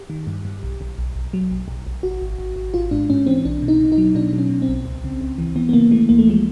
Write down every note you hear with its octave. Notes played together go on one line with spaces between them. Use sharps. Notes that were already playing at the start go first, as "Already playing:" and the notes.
Already playing: G4
D#3
G2
G2
B1
B1
B1
B1
F#3
B1
B1
B1
G#1 F#4
G#1
G#1
G#1
G#1 F4
G#2 D4
G#2 C#4
E3 C4
B1 D4
B2
D#4
B2
D#4
F#3
B2 D4
F#3
C#4
B2
C4
B1
C#2
C#3
C#2
E3
E3 B3
B3
C#3 A#3
E3 A3
C#2 A#3
A3
F3 G#3